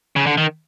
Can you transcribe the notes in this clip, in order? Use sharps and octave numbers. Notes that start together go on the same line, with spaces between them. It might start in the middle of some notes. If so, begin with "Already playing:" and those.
C#3
D3
D#3